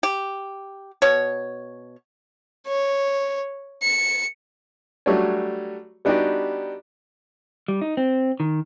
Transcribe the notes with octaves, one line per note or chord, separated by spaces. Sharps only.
G4
B2 C#5
C#5
C#7
F#3 G3 A3 D4 F#4 C#5
G3 B3 D4 D#4 F#4 G4
G3
D#4
C4
D#3